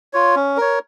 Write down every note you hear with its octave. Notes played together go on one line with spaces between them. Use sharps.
F4 C#5
C#4
A#4 C#5